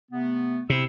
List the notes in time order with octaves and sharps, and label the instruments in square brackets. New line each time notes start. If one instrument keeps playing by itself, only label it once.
[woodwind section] C3 A3 B3
[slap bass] C3 [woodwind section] E4 E6